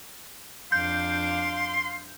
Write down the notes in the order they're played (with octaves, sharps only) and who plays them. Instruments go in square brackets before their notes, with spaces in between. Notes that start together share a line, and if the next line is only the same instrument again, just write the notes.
[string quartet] F2 D4 D6 [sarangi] F5 [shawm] C6 [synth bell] G6